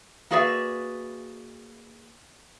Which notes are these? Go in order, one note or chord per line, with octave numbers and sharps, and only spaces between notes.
A#3 F#4 G#4 B4 D5 E5